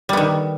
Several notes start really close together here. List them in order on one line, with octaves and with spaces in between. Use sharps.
G3 B3 D#3